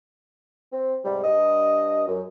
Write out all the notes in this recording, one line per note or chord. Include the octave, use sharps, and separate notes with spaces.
C4
G#2 C3 G3
G2 D#5
F#2